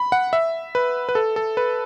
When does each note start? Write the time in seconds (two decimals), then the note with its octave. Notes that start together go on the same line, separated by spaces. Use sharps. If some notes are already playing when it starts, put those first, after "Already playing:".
Already playing: B5
0.12 F#5
0.33 E5
0.75 B4
1.09 B4
1.15 A4
1.36 A4
1.57 B4